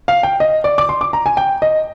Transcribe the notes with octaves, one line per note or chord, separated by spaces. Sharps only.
F5
G5
D#5
D5
D6
C6
D6
A#5
G#5
G5
D#5